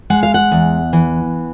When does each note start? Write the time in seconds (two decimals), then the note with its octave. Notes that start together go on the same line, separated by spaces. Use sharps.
0.10 G#3 F#5
0.23 F5
0.34 F#5
0.52 E2
0.93 E3